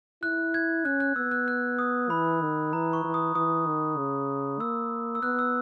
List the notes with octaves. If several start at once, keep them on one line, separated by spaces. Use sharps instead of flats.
E4 F#6
G#6
C#4 F#6
F#6
B3 E6
F#6
F#6
D#6
E3 B5
D#3
E3 A#5
C#6
E3
D#6
E3 D#6
D#3
C#3
A#3 E6
E6
B3 F#6
E6